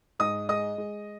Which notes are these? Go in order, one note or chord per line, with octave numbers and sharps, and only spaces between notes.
G#2 D#5 D#6
G#3 D#5 D#6
G#3